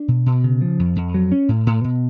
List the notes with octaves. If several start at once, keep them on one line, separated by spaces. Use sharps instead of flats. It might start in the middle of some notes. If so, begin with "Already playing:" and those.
Already playing: D4
B2
B2
C#3
F3
F2
F2
F#3
C#4
A2
A2
B2